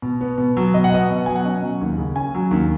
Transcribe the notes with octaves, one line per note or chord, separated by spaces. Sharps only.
B2
B3
B2
F#3
B2 D#5
F#5
B3 D#5
B2
F#3 G#5
F#5
C#4 D#5
F#3
D#2
C#3
C#4 G#5
F#3
D#2